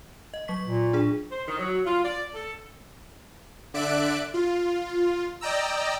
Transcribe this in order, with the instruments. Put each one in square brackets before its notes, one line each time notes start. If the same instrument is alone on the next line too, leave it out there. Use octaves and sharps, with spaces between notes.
[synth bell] D#5
F#3 C#6 B6
[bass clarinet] A#2
[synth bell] D4 G#4
[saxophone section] C5
D#3
F#3
F4
D5
A4
[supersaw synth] D3 D5 E5 F#6 D7
F4
D5 D#5 G5 A#5 E6